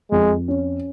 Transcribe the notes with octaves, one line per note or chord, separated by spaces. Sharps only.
F2 G#3
C#4